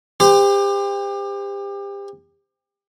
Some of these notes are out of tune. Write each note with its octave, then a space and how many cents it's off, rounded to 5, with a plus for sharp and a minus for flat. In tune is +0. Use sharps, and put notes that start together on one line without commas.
G4 +30 C5 -25